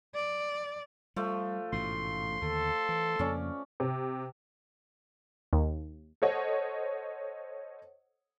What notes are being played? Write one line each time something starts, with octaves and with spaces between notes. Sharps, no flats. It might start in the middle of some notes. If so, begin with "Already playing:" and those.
D5
F3 G3 A3
A1 G#2 B2 C6
D#2 D3 A4
E3
F2 C#3 A#3 C#4 D5
C3
D#2
A4 C5 C#5 D#5 F#5